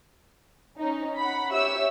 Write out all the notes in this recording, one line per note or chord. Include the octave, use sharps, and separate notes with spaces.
C#4 D#4
F#5 B5
G4 C#5 E5 E6